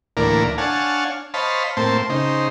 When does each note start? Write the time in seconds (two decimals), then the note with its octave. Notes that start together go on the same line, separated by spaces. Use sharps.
0.17 D2 A2 E3 A#3 A#4 D5
0.58 D4 C#5 F5 F#5 G#5 A5
1.34 C5 C#5 D#5 F5 A5 B5
1.77 A2 A#3 C4 C5 A5
2.10 C#3 D#4 C5